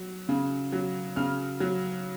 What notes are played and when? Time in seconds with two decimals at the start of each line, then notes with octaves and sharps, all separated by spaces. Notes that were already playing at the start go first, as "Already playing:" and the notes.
Already playing: F#3
0.29 C#3
0.72 F#3
1.16 C#3 F6
1.60 F#3